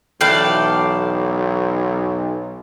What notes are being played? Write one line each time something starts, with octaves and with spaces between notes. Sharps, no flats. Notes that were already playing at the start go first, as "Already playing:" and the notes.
B1 E2 A4 D5 F5 G5